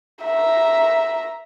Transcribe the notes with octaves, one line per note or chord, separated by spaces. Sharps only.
E5 A#5